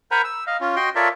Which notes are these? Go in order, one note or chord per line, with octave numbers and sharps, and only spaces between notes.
A#4 C5 F#5 G#5 A#5 B5
E6
D#5 F5
C#4 F4
F#4 D#5 G5 C6
F4 A4 A#4 C#5 D5 E5